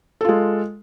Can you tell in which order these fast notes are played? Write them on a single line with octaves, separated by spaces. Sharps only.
A4 F4 G#3